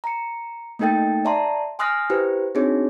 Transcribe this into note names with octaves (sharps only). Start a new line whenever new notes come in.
A#5 C#7
A3 A#3 D#4 A4 G5 A6
D5 E5 A5 A#5 C6
G#5 C6 D#6 F6 F#6 A#6
E4 G4 B4 C5
C4 D4 D#4 F#4 G#4 C#5